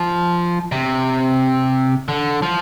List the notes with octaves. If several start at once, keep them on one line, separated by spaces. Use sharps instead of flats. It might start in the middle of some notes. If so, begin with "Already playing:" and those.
Already playing: F3
C3
D3
F3